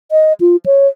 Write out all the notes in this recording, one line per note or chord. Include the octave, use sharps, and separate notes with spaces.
D#5
F4
C#5